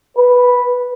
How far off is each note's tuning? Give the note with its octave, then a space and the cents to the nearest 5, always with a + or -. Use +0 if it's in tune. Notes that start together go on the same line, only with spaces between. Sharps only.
B4 -5